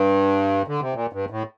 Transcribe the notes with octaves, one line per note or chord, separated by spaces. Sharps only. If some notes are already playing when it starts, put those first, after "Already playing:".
Already playing: G2
D3
C3
A#2
G2
A2